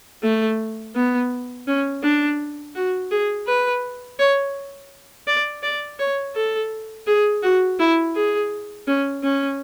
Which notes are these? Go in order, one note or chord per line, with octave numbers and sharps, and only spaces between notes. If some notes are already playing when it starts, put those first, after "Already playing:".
A3
B3
C#4
D4
F#4
G#4
B4
C#5
D5
D5
C#5
A4
G#4
F#4
E4
G#4
C#4
C#4